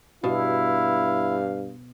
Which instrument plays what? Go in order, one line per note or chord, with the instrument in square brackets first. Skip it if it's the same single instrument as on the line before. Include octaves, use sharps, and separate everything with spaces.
[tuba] G2 [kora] B2 [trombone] E4 [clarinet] F5